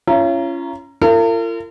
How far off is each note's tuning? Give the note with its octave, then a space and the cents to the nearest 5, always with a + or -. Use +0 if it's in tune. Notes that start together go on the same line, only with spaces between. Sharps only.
C#4 +0 F4 -45 A#5 +0
F4 -45 A#4 -45